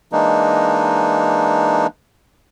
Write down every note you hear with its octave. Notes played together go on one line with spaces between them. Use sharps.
E3 G#3 A#3 D4 D#4